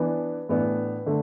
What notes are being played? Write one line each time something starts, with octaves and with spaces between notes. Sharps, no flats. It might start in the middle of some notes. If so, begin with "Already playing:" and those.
Already playing: E3 B3 D4
A2 E3 B3 D4
D3 A3